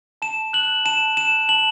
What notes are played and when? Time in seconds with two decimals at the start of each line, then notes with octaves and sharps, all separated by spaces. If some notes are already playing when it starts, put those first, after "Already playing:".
0.22 A5 E7
0.53 F#6 F#7
0.85 A5 E7
1.17 F#6 E7
1.49 A5 F#7